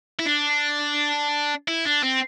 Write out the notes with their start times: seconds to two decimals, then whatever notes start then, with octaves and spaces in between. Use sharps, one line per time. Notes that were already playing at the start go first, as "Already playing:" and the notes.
0.19 E4
0.26 D4
1.68 E4
1.86 D4
2.04 C4